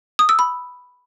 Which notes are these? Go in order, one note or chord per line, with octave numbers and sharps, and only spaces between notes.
D#6
E6
B5